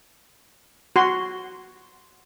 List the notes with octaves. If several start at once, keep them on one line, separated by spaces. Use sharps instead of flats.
F#4 C6